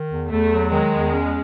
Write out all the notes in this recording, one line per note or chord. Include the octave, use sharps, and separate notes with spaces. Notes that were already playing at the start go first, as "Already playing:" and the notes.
Already playing: D#3
E2
E2 A3
F#3
D#3 G#3
E2
C#4